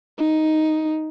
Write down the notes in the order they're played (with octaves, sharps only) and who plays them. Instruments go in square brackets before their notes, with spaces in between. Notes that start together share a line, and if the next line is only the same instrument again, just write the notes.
[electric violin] D#4